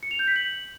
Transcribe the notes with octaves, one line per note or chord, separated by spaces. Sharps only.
C#7
F7
G6
B6
F#7